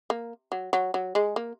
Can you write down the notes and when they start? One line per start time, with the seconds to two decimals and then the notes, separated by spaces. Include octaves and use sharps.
0.10 A#3
0.52 F#3
0.73 F#3
0.94 F#3
1.15 G#3
1.36 A#3